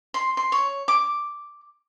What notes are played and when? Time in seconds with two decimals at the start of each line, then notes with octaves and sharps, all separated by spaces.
0.14 C6
0.37 C6
0.52 C#5
0.88 D6